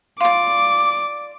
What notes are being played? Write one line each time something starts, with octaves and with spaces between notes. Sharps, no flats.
F4 D5 D6